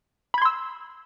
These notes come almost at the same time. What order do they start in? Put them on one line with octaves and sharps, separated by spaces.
B5 G#6 C6 E6